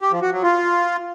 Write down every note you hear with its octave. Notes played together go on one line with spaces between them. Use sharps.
G4
F3
F#4
F#3
F4